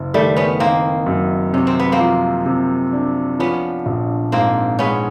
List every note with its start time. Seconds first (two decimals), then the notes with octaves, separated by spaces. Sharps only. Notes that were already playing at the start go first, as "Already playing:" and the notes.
Already playing: F#1
0.14 D#3 G3 A3
0.36 B3 C#4
0.60 D#3 A#3 C4
1.06 F#2
1.53 C3 C#4
1.67 C4
1.79 B3
1.92 A#3 C4
1.99 F3
2.46 C3
2.93 D4
3.39 F3 B3 C#4
3.86 A#1
4.32 G#2 A#3 C4
4.79 G#3 B3 C#4